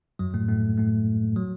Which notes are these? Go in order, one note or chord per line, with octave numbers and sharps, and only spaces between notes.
F#2 F#3
A2 A3
A2 A3
A2 A3
F#3